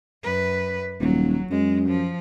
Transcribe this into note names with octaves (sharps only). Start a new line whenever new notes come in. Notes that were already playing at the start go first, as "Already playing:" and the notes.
F#2 B4
D#1 F#3
F#2 G#3
F3